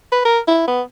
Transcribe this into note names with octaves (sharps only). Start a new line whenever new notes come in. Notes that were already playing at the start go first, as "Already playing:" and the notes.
B4
A#4
E4
B3